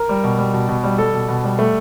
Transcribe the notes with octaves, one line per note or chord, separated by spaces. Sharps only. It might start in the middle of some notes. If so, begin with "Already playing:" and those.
Already playing: A#4
G3
B2
G3
B2
B2
G3
G3 A4
B2
B2
G3
A3